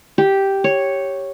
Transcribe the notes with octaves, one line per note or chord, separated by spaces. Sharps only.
G4
C#5